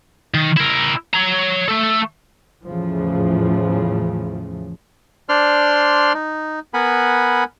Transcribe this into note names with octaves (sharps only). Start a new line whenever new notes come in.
D#3
E4 A#4
C#5 A#5
A3 A4
E2 A2 C#3 E3 F3
D4 C5 D5 C6 F6
D#4
B3 A#4 F#5 G#5 B5